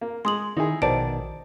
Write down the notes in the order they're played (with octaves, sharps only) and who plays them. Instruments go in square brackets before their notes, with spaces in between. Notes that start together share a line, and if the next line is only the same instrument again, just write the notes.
[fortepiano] A#3
[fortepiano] G#3 [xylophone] C6 D#6 F#7
[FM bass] D#3 [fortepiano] D#4 E4 G#4
[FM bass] A#1 [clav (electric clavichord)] B2 D#3 [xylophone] C5 A5 D7 [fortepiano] D5